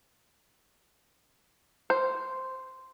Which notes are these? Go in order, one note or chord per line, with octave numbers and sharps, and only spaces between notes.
C5